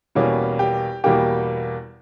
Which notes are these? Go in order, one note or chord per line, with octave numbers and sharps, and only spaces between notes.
E2 B2 G3 A#3 C#4
G4
E2 B2 G3 A#3 G4